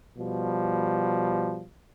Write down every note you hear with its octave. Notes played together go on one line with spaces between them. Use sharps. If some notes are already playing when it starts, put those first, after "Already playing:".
B2 F3 G3